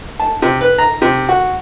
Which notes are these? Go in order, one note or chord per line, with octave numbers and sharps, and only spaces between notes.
A5
C3
B4
A#5
C3
F#4